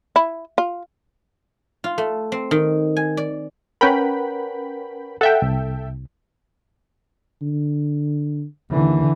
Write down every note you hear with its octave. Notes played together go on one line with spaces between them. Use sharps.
E4
F4
F4
A3
C4
D#3
G#5
D5
C#4 A#4 B4 F#5 G5 B5
A4 E5 F#5 G5
C2
D3
D#2 D3 E3